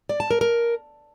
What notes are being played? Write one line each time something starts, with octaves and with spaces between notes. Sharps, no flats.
D5
A5
A#4
A#4